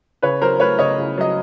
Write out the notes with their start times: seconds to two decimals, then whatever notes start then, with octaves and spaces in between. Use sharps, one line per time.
0.22 C#3 B4 C#5
0.42 F#3 A#4 C5
0.60 A3 B4 C#5
0.79 C#3 C#5 D#5
0.98 C#3
1.17 F#3 D#5